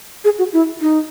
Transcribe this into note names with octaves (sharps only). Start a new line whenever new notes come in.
G#4
F#4
E4
D#4